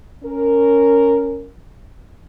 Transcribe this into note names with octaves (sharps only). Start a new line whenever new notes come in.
C#4 A#4